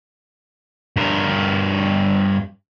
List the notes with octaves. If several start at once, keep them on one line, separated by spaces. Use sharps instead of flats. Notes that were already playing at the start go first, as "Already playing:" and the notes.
G2 A#4